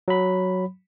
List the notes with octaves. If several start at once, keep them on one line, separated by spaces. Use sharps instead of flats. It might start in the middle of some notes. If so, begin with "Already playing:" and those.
F#3 B5